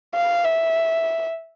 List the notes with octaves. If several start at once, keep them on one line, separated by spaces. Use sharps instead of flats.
F5
E5